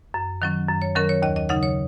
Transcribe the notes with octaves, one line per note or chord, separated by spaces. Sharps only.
F#2
D#3 F#3 C#4
F#2
C#5
D#3 F#3 C#4 A#4
C#5
D#2 D#5
D#5
C#3 F#3 D#4 F#5
C#5